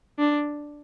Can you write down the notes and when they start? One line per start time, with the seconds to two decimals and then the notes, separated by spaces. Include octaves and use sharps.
0.19 D4